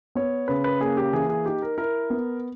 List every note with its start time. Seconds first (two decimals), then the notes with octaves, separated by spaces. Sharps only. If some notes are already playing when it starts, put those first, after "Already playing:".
0.15 B3 C#5
0.48 C#3 B4
0.64 B4
0.81 A#3 G#4
0.97 G4
1.13 E3 G#4
1.29 G#4
1.46 D#4 G4
1.62 A#4
1.78 E4 A#4
2.10 B3